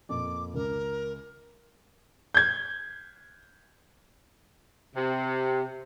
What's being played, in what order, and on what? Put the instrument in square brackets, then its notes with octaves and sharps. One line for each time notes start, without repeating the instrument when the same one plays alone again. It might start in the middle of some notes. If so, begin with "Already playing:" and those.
[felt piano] F2 A#2 [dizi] D6
[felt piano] C#2 [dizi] A#4
[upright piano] G6 G#6
[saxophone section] C3